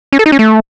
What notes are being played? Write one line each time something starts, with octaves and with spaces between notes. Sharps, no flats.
C#4
A4
D#4
C#4
A3